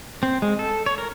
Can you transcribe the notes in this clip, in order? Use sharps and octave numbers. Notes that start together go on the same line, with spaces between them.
C4
G#3
A4
C#5
A#4